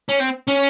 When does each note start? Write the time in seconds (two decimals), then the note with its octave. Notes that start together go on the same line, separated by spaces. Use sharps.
0.09 C#4
0.20 C4
0.48 C#4